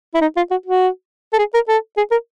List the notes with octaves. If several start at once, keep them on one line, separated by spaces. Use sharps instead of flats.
E4
D#4
F4
F#4
F#4
A4
G#4
A#4
A4
G#4
A#4